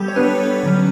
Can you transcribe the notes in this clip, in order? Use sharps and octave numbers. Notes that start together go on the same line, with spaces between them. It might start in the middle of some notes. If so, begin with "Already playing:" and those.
Already playing: G3 B3 G4 A4
C#5
G3 B3 D4 B4
D3 F#3 C#4